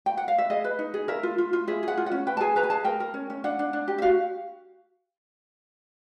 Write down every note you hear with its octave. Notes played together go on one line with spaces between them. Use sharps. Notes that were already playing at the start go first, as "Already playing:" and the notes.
G5
F#5
F5
E5
G#4 D#5
B4
D#4
G#4
A#4 E5
F4
F4
F4
G#4 E5
G#4 F#5
F4
F#5
C#4
B4 G5
A5
G#4 G#5
B4 A#5
G#5
G#4 A5
A#4 G5
A#4
C#4
C#4
D4 F#5
D4
D4
G4
E5
F#4 F5